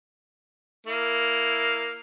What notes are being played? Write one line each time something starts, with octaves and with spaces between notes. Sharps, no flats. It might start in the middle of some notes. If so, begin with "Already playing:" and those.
A#3 E4